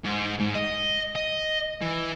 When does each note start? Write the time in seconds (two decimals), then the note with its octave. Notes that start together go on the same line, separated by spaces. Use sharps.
0.04 G#2
0.40 G#2
0.56 D#5
1.16 D#5
1.81 E3